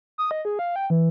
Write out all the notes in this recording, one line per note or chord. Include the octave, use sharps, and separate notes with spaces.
D#6
D#5
G#4
F5
G5
E3